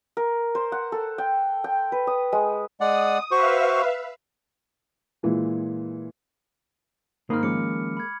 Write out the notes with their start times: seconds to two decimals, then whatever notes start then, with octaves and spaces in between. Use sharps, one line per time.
0.17 A#4
0.55 C5
0.72 F#5
0.92 A4
1.18 G5
1.64 G5
1.92 B4
2.07 D#6
2.32 G#3
2.80 G#3 D5 F#5 D#6
3.31 F#4 B4 C5 E5 F5 C#6
5.23 A#2 E3 G#3
7.30 G#2 D#3 A#3 B5 D#6 F6
7.43 D#3 F3 G#3 C#4 D6 C#7
7.97 B5 G#6